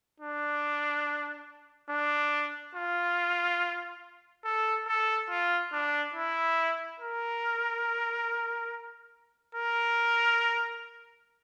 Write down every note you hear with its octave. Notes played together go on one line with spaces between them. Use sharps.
D4
D4
F4
A4
A4
F4
D4
E4
A#4
A#4